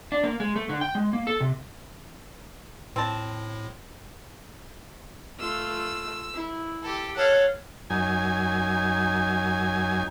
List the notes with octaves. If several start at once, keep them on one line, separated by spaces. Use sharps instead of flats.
D4
A#3
G#3
A3
D3
G5
G#3
A#3
A4
C3
A2 C4 A5
A3 F4 E6
E4
G4 A4
A4 C#5 F5 F#5
F#2 D#4 G#5